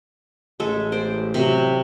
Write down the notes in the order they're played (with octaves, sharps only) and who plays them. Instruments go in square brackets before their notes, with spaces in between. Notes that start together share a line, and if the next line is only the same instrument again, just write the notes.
[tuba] A1 [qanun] G#3 A4 E5
[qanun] C5 D5
C3 F#3